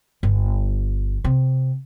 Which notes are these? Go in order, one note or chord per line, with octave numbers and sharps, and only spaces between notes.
G1
C3